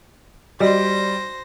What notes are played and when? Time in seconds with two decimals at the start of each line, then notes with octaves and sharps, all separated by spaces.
0.60 G3 F#4 C5 D5 D#5 A#6